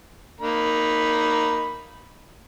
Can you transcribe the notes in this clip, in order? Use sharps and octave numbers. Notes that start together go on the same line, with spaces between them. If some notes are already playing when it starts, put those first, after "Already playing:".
A#3 D#4 B5